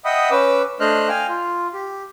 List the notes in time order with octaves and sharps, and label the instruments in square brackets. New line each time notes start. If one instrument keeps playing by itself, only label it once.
[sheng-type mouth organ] D#5 E5 F#5 G5 B5 D#6
C#4 B4 D6 E6
A3 D4 C5 D#5 F6 F#6
F5 G5 G#5 F6
F4
G4